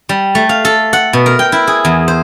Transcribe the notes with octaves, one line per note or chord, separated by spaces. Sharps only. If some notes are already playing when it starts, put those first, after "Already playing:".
G3
A3
F5
A4
F#5
B2
A#4
G5
E4
G#4
E2
C5